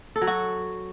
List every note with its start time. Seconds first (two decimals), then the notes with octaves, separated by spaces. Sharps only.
0.16 A4
0.21 F#3
0.27 F#4